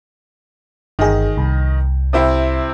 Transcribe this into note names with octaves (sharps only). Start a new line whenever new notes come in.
G1 D#3 G#4 D#5
C2
C3 C4 E4